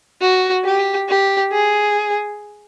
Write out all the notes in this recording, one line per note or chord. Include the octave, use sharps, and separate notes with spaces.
F#4
G4
G4
G#4